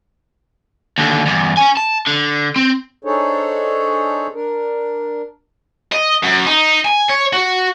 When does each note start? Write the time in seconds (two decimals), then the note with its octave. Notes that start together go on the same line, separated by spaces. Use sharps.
0.98 D#2 D3
1.26 E2 G2
1.57 C#4 G#5
1.77 A5
2.07 D3
2.56 C4
3.05 D4 D#4 G#4 A4 C5 C#5
4.34 D4 A#4
5.92 D#5
6.23 F#2
6.46 D#4
6.85 G#5
7.09 C#5
7.33 F#4